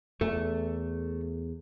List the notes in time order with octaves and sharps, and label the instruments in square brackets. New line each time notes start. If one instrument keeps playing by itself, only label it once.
[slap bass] E2 [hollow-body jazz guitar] A3